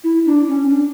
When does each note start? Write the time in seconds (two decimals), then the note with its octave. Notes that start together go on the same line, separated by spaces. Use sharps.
0.04 E4
0.26 D4
0.48 C#4
0.70 D4